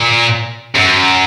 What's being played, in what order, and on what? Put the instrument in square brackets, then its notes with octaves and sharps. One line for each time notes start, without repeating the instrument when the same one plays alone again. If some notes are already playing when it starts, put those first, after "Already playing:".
Already playing: [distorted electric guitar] A#2
F#2